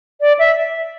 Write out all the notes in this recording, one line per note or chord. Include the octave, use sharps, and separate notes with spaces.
D5
E5